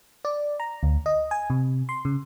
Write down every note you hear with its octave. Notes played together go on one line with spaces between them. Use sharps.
D5
A#5
D2
D#5
G#5
C3
C6
C#3